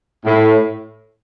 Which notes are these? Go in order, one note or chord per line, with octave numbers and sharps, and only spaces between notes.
A2